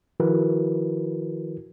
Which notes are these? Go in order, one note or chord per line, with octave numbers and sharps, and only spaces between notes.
D#3 F3 E4 F#4 A#4 B4